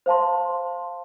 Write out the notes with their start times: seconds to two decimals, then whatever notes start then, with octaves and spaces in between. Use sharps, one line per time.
0.06 C5 F5 A5 C6